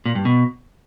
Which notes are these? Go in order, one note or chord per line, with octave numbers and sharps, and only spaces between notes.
A#2
G2
B2